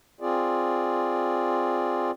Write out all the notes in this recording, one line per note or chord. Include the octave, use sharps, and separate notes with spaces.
C4 F4 G#4 D5